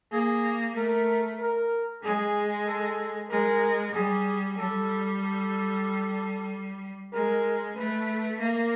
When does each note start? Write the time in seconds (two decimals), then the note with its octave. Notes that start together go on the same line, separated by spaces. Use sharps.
0.12 A#3 G#4
0.75 A3 A#4
1.39 A#4
2.03 G#3 G#4
2.67 A4
3.30 G#3 A#4
3.94 G3 G#4
4.57 G3 A4
5.22 A4
7.13 G#3 A#4
7.76 A3 B4
8.40 A#3 A#4